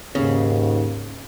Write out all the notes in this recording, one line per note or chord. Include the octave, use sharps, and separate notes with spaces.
D#2 G#2 C#3